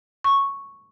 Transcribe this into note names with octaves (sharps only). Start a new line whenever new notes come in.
C#6